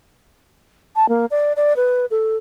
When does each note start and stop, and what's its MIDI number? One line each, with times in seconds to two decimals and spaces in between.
0.96 1.08 81
1.09 1.25 58
1.31 1.53 74
1.56 1.76 74
1.76 2.05 71
2.11 2.36 69